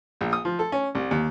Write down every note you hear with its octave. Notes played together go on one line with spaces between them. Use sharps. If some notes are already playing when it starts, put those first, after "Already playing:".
A#1
D#6
F3
A4
C#4
C2
D#2